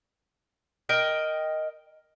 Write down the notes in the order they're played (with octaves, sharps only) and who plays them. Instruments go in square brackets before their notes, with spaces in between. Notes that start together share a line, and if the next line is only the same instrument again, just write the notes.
[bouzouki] A#4 D#5 G5